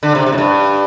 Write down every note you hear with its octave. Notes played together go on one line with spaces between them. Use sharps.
D3
C3
C3
A2
G2